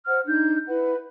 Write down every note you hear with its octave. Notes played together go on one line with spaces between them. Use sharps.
C5 F#5 F6
D4 D#4 G6
E4 B4 F#5